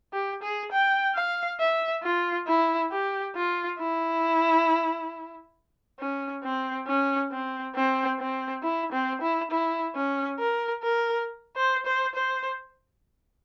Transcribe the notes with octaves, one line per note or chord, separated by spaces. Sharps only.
G4
G#4
G5
F5
E5
F4
E4
G4
F4
E4
C#4
C4
C#4
C4
C4
C4
E4
C4
E4
E4
C#4
A#4
A#4
C5
C5
C5